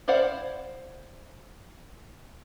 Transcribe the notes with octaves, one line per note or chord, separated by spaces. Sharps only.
E4 C5 D5 F5 F#5